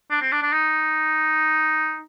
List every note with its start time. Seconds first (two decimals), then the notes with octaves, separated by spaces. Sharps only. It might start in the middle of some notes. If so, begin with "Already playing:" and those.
0.11 D4
0.21 C4
0.32 D4
0.42 D4
0.53 D#4